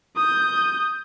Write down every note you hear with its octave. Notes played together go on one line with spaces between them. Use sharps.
D#6 G6